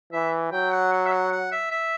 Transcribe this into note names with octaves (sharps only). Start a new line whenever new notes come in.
E3 E5
F#3 G5
F#5
F#5
E5
F#5
F#5
E5
E5